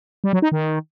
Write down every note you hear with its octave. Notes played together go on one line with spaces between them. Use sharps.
G3
F#3
D#4
D#3